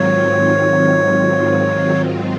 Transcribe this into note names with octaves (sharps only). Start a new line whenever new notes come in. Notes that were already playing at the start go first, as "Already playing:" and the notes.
Already playing: G#2 D#3 F#3 C4 F4 C#5